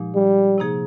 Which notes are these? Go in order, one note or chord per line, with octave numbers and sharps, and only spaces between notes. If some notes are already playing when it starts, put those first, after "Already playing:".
Already playing: A#2 F3 G#3 D#4 G4
G3
C3 F3 A#3 D#4 G#4